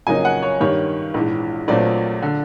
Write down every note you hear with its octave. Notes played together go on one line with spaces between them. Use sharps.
F2 C#3 F#3 A#3 D#4 G#5
F#5
C#5
G2 D#3 G3 A#3 C#5
A#1 G#2 E3
A#1 A#2 F#3 A3 C4 D5
D3